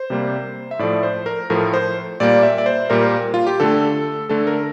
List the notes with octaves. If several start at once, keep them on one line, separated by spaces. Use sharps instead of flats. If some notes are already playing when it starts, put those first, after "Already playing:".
Already playing: C5
C3 G3 A#3
E5
A2 F3 A3 D5
C5
A#4
A2 F3 A3 A#4
C5
A#2 G3 A#3 D5
E5
D5
C5
A#2 G3 A#3 A#4
F4
G4
D3 A3 A4
D3 A3 A4
A#4